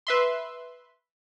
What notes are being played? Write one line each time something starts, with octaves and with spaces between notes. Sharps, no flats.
B4 E5 C6